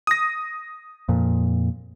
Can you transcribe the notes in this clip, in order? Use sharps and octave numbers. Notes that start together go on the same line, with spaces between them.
D#6 A#6
F2 A#2